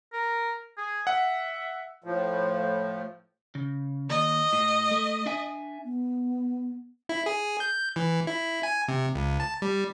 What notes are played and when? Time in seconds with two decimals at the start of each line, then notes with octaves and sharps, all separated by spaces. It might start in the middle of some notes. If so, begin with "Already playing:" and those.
0.13 A#4
0.77 G#4
1.07 E5 F#5
2.04 A2 F3
3.55 C#3
4.09 D#2 D#5
4.53 A2
4.91 A3
5.26 D4 E5 G#5
5.85 B3
7.09 E4
7.26 G#4
7.60 G6
7.96 E3
8.27 E4
8.63 G#5
8.88 C3
9.15 C#2
9.40 A5
9.62 G3